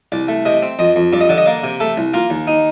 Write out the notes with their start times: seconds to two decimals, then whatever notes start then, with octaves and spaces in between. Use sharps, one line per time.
0.12 C2 D5
0.28 A3
0.46 C3 D#5
0.62 C4
0.79 F2 D#5
0.96 F2
1.13 G2 D5
1.21 D#5
1.29 D3 D5
1.38 D#5
1.46 A#3 D5
1.64 C3
1.80 A3 A4
1.98 C2
2.14 A#3 F4
2.30 D#2
2.47 D#4